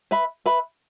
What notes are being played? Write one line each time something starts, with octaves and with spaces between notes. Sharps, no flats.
B4 E5 B5
B4 E5 B5